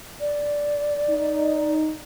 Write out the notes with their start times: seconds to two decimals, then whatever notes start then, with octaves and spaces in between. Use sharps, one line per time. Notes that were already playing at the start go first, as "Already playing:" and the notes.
0.20 D5
1.10 D#4